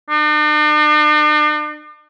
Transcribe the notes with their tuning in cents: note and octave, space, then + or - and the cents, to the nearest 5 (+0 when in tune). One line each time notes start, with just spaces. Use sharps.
D4 +45